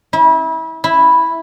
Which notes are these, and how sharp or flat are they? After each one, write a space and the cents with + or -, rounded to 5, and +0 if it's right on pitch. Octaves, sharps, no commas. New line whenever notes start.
E4 -30
E4 -5